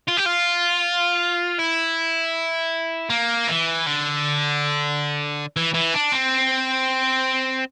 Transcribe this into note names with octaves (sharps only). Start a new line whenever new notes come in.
F4
G4
F4
E4
A#3
E3
D3
E3
E3
D4
C4